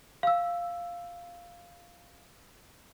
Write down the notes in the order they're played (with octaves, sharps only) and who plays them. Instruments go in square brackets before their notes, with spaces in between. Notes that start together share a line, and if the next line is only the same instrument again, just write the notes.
[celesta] F5 E6